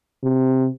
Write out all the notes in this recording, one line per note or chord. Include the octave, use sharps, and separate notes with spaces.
C3